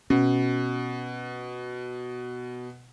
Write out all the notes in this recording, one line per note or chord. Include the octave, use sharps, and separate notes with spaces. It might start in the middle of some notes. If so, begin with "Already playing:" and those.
B2 C#4